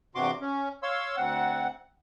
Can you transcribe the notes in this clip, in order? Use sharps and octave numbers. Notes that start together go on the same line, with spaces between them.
E2 G2 C3 F#4 C6 D6
C#4
C#5 F5 C6 E6
D2 C4 F#5